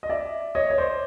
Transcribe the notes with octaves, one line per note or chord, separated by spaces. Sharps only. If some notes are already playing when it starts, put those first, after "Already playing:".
D#5
D5 E5
C#5 D#5
C#5
C5 D5